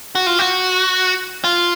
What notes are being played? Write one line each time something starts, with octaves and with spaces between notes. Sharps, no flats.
F#4
F4
F#4
F4